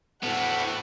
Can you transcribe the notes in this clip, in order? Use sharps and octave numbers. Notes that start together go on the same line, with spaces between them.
D2 A2 E3 B3 F#5